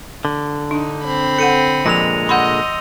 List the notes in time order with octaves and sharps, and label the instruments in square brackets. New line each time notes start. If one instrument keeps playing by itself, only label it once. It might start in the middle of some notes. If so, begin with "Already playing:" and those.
[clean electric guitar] D3
[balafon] D4 [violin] D#4
[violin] C4 B5
[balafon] A4 F#5 [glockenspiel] C#7 D#7
[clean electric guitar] A#2 D3 G#3 [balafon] F3 [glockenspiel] A#6 F7
[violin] D#5 [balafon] F#5 B5 [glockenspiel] C6 E6 G6